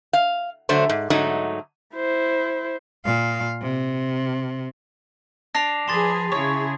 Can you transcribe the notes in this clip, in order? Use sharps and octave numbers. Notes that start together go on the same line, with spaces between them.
F5
D3 F#3 A3 C5
G#2
G#2 D3 F#3 A3 D#4
E4 C5
A#2 F5
C3
D4 A#6 C7 F7
F3 G#4 B4 A5 C6 A6
C#3 E4 G#4 C#5